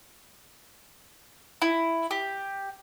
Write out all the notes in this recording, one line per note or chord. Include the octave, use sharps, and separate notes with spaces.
E4
G4